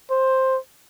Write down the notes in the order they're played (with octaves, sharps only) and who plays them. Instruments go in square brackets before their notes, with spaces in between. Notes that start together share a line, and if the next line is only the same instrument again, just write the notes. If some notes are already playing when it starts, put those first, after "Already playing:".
[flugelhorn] C5